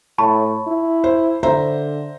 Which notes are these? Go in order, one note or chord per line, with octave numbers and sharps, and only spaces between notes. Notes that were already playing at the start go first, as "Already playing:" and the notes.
A2 A5 B5 C#6
E4
C5
D3 C5 E5 A#5